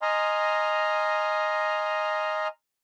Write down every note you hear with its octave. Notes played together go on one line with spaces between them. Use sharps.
D#5 G#5 A#5 C6 F6